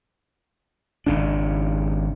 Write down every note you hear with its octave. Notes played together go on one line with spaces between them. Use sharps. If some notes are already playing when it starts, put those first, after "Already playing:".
G#1 C#3 D4